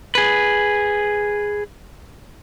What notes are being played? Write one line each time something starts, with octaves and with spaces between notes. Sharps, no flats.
G#4 B4